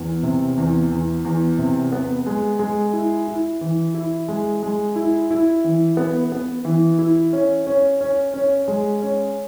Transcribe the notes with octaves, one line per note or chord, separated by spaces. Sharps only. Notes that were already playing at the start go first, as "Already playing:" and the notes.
Already playing: E2
C3
E2
E2
E2
C3
B3
G#3
G#3
E4
E4
E3
E4
G#3
G#3
E4
E4
E3
B3
B3
E3
E4
C#4
C#4
C#4
C#4
G#3
C#4